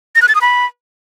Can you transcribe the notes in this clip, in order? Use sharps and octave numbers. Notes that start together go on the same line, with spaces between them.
A#6
F#6
A6
D#6
B5